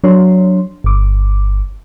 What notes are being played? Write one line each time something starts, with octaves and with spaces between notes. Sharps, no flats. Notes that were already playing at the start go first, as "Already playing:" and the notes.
F#3 D4 C#5 C6
G1 D6